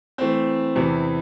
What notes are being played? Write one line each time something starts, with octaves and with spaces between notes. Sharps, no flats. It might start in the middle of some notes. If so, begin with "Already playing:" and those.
E3 A3 C4
E2 C3 E3